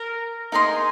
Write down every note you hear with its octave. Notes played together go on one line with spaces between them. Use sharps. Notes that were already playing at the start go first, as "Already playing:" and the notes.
Already playing: A#4
D#4 G#4 A#4 D#5 C6